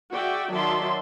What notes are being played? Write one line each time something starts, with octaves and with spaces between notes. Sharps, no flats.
F#4 G#4 D5 E5 G5
D#3 F#3 D5 E5 A5 C6